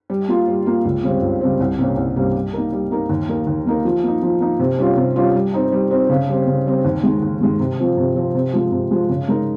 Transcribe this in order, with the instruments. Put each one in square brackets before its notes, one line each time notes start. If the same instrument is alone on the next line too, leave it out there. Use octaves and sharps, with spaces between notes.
[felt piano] G3
A#3 F4
G3
A#3 F4
C#2
C#3 G3 C4
C#2
C#3 G3 C4
C2
C3 G3 A#3 C#4
C2
C3 G3 A#3 C#4
G3
A#3 D#4 A#4
G3
A#3 D#4 A#4
D#2
D#3 A#3 D#4 A#4
D#2
D#3 A#3 D#4 A#4
F3
A#3 D#4
F3
A#3 D#4
C3
G3 C#4 F4
C3
G3 C#4 F4
G3
C4 D#4
G3
C4 D#4
C#3
G3 C4
C#3
G3 C4
D#2
D#3 G#3
D#2
D#3 G#3
C3
F3 C4
C3
F3 C4
C3
F3 G#3
C3
F3 G#3
C#3
G#3 D#4 A#4